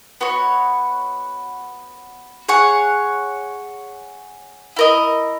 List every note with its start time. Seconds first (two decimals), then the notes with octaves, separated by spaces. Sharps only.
0.21 B3 F#4 C#5
2.48 G#4 C#5 F#5
4.76 E4 A#4 D#5